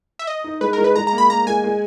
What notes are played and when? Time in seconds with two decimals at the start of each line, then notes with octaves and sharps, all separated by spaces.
0.19 E5
0.27 D#5
0.44 D#4
0.61 G#3 B4
0.73 A#4
0.78 G#3
0.84 B4
0.96 G#3 A#5
1.07 A#5
1.12 A#3
1.18 B5
1.29 A#3 A#5
1.47 G#3 G#5
1.64 G#3